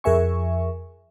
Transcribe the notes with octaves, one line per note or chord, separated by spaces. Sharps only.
F2 G#4 A#4 E5 G#5 C#6